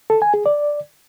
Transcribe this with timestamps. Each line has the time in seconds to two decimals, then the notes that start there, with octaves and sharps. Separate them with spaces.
0.10 A4
0.22 G#5
0.34 G#4
0.46 D5